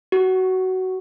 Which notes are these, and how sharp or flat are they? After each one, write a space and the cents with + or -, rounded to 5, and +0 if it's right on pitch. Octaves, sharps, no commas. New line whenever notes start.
F#4 +15